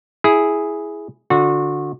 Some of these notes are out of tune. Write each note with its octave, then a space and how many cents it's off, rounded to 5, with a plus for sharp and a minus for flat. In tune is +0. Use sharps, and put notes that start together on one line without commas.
E4 +0 G#4 +0
D3 +0 F#4 -30